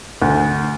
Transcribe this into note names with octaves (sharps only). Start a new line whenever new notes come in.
D2